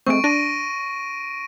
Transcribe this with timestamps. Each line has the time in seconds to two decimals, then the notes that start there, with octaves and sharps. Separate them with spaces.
0.07 G#3 A3 C4 C#6 D7
0.24 D4 A#6 D#7